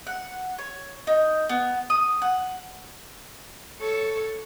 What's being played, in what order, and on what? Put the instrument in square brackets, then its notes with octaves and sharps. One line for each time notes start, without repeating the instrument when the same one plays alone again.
[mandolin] F#5
C#5
D#4
B3
D#6
F#5
[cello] A4 C#5